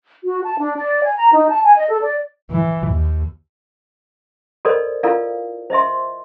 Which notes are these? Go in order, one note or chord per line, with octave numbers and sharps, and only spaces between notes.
F#4
A5
D4
D5
G#5
A#5
D#4
A5
G#5
D#5
A4
D5
E3
D#2
F#4 A4 A#4 C5 D5 D#5
E4 F4 A4 A#4 D5 F5
C5 D#5 E5 C6